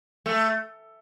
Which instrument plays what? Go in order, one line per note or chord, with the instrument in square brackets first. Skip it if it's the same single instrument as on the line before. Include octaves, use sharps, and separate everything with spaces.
[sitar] A3